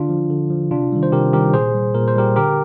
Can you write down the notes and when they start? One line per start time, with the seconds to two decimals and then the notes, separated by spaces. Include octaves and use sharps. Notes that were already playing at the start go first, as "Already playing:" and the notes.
Already playing: D3 D4 F4
0.09 F3
0.30 D3
0.51 F3
0.71 C3 D4 F4
0.92 D#3 G3
1.03 C5
1.12 C3 G4 A#4
1.33 D#3 G3 G4 A#4
1.53 A#2 G#4 C5
1.75 G3
1.95 A#2 A#4
2.08 C5
2.16 G3 G4 A#4
2.36 D3 G4 A#4